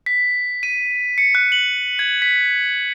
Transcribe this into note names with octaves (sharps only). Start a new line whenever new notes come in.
B6
D#7
C#7
F#6
F#7
G#6
B6